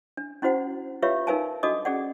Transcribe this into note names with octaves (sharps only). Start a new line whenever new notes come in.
D4
C#4 E4 F#4 C5 F#5
F4 G4 B4 C#5 E5 F5
D#4 A#4 B4 F5 G#5 A5
D4 F#4 A4 D#5 D6 D#6
C#4 G#4 D5 F#5